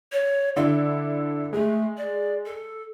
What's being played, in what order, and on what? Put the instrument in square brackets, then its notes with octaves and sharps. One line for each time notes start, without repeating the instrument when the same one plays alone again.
[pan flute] C#5
[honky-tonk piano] D3 D4 E4 [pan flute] A4
[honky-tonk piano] G#3 [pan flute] A3
[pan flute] D5
A4